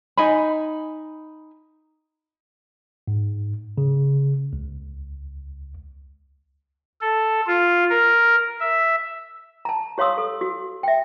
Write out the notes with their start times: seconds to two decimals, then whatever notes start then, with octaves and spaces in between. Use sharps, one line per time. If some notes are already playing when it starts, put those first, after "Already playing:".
0.17 D#4 G#5 B5
3.08 G#2
3.78 C#3
4.53 C#2
7.01 A4
7.47 F4
7.90 A#4
8.60 E5
9.65 A5 A#5
9.98 G4 C#5 F5 C6 D#6 E6
10.18 A4
10.41 F#4
10.83 E5 G5